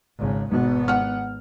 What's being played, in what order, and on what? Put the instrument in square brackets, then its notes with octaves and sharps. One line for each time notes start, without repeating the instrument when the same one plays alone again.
[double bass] G#1 C#3
[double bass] G#1 B3 [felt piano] G#2 B2
[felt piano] F#5 F6